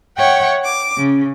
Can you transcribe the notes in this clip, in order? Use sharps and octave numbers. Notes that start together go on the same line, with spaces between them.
C#5 E5 F#5 G5 C#6
D6
C#3